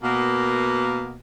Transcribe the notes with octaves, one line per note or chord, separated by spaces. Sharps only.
B2 A#3